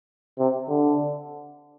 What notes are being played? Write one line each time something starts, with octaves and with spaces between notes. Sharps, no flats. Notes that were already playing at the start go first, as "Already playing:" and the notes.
C3
D3